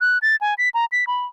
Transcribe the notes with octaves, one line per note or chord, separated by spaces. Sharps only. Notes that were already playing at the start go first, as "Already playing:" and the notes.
F#6
A6
G#5
B6
A#5
B6
B5